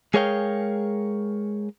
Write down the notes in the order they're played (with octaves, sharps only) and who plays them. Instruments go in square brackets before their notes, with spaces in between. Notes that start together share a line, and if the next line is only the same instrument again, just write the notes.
[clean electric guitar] G#3 G#4 A#4 C#5 F5 G5